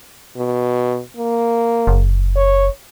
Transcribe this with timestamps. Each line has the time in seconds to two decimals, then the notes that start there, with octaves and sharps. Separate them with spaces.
0.36 B2
1.17 A#3
1.87 F#1
2.36 C#5